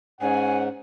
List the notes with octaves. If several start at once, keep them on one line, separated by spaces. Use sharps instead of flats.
G#2 C#4 F#5 G#5